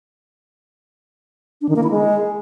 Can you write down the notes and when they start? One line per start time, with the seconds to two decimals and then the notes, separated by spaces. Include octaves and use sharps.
1.61 D4
1.69 D#3
1.76 A#3
1.83 E4
1.91 G#3